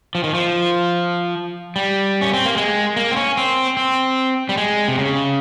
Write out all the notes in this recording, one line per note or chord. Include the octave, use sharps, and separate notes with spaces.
F3
D#3
F3
G3
C#4
C4
A#3
G#3
A#3
C4
C#4
C4
C4
G3
G#3
C3
C#3